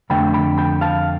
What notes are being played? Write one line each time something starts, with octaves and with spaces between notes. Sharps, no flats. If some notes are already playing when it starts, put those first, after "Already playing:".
F2 D3 A3 G5 B5
G5 B5
G5 B5
F5 A5